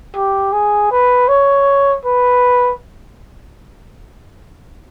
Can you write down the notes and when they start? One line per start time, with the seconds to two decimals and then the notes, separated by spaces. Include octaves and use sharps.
0.15 G4
0.53 G#4
0.91 B4
1.28 C#5
2.05 B4